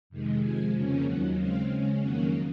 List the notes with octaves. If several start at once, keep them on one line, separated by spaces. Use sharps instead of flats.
F2 C3 D#3 G#3
C3 F3 G#3 G#5
F2 C#3 F3 A#3 C#4
D#2 D#3 F#3 F#5
C#3 G#3 C4 F5
C#3 G#3 C#4
F2 D#3 F#3 A#3 C#4 F#5